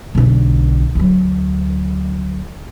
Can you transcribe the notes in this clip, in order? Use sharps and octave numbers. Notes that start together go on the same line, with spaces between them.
B1 D3
D2 F#3